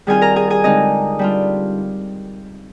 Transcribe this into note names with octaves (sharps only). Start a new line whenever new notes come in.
D#3 G3 C4 F4 G#4 G#5
A#4 A#5
G#4 G#5
G#4 G#5
D3 G#3 C4 D#4 D#5
G3 D4 F4